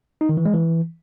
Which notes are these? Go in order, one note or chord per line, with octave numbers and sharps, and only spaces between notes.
D#4
D#3
E3
G#3
E3